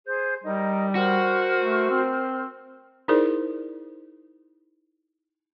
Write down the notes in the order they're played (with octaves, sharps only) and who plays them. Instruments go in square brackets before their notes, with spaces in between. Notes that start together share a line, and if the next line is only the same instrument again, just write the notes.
[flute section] G#4 C5 G6
[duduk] G3 [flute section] D#4 A#4 D#5
[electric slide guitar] F#4 [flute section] A#4 C5 F6
[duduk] A3
C4
[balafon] D#4 E4 G#4 A#4 C5 D5